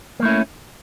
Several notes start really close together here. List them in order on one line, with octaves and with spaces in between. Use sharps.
A#3 A3 E4 C#4